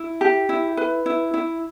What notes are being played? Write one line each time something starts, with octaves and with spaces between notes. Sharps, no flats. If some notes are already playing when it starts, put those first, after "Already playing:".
Already playing: E4
G4
E4
B4
E4
E4